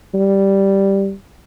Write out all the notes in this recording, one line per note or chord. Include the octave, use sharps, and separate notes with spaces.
G3